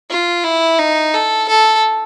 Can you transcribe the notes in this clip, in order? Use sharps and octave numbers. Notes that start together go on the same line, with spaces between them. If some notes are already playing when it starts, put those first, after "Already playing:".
F4
E4
D#4
A4
A4